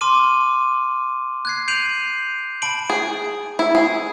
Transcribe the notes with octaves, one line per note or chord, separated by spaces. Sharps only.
A5 C6 D6 F6 D#7
F#6 G#6 C7
G6 C7 D7 D#7 F7 F#7
A5 B5 D7 F#7
G#4
E4
G#4